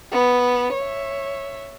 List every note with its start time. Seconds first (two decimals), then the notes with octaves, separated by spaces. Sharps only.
0.12 B3
0.75 C#5 E5